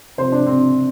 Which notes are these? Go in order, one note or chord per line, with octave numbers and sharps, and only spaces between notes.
C3 F3 C5
D4
C4